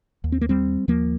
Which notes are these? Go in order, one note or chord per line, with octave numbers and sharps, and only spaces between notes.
D#2
C4
A#3
G3 C4
D#2 F3 A#3